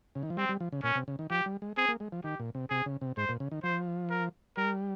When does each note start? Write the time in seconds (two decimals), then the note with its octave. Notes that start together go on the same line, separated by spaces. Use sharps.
0.15 C#3
0.23 D#3
0.30 F3
0.37 G3 C4
0.49 G3
0.60 F3
0.72 C#3
0.83 A#2 C#4
0.95 C3
1.08 C#3
1.19 D#3
1.30 F3 G4
1.46 G3
1.62 G#3
1.77 C4 G#4
1.88 A#3
2.00 G#3
2.12 F3
2.24 D#3 G4
2.40 A#2
2.55 C3
2.70 C3 G#4
2.86 C#3
3.01 C3
3.17 G#2 C5
3.29 A#2
3.40 C#3
3.52 D#3
3.63 F3 C5
4.10 A#4
4.57 G3 A#4